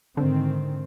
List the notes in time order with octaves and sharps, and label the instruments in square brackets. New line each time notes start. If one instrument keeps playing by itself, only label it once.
[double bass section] G#2 D#3 C4 [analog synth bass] D3